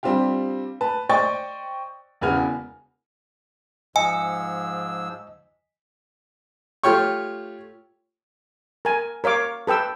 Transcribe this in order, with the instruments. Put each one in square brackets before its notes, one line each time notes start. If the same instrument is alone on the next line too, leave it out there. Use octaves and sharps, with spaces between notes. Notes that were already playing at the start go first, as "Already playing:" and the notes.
[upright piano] G3 C4 D4 F4 G4
B4 A5
C5 D5 D#5 G5 C#6 A6
E1 E2 C#3 B3 G#5 F6
[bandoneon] G#2 F3 E6 [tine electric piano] D#5 [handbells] G#5
[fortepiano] A3 F4 G4 C#5 G5 C#6
[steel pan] A#4 G#5
A#4 C#5 F5 D6
A4 B4 G5 E6